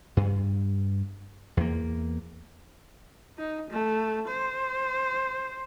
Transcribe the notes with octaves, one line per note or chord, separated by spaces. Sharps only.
G2
E2 A#3
D#4
A3
C5